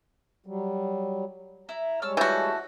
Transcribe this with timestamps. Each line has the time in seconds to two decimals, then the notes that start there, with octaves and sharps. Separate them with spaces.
0.46 F#3 G3
1.69 E4 A#5
2.02 G3 G#3 C#5 A5 E6 F6
2.17 E3 A3 F#4 A4 G6